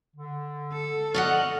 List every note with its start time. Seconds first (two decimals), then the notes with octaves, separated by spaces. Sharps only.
0.16 D3
0.73 A4
1.14 D5 D#5 F#5 C#6 F6